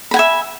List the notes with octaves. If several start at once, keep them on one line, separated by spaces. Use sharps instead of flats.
E5 F#5 G#5 B5